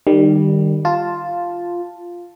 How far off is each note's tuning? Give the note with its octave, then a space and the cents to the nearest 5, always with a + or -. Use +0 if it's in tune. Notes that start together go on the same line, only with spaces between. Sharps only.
D#3 -30 G3 +0
F4 +0 A5 +0